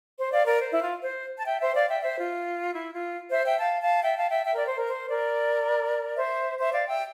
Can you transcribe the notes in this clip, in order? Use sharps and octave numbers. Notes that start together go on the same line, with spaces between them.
C5
D5 F5
A#4 D5
C5
E4
F4
C5
A5
E5 G5
C5 E5
D5 F5
E5 G5
C5 E5
F4
E4
F4
C5 E5
E5 G5
F5 A5
F5 A5
E5 G5
F5 A5
E5 G5
E5 G5
A#4 D5
C5
A#4
C5
A#4 D5
C5 E5
C5 E5
D5 F5
E5 G5